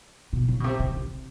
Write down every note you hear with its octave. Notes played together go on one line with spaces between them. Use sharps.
B2
C#3
B2
C3
C3
C3